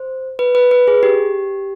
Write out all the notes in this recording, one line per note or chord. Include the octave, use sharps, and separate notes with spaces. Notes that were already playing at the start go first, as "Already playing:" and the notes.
Already playing: C5
B4
B4
B4
G#4
G4